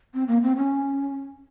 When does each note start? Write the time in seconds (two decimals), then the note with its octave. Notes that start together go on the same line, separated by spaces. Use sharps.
0.14 C4
0.28 A#3
0.42 C4
0.57 C#4